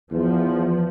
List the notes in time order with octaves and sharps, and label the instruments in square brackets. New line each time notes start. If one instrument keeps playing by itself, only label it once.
[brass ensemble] E2 [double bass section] F3